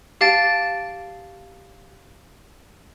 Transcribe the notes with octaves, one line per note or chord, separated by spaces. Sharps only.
G4 F5 A5 A6 D7